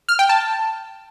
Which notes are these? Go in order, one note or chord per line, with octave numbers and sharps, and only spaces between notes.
F6
G5
A5